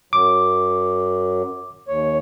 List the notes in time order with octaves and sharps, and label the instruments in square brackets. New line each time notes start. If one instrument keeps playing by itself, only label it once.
[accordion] F#2 F#3 [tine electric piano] D6
[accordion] D#2 C#5